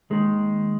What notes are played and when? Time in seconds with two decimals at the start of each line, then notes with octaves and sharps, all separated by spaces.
0.10 D#2 D#3 G#3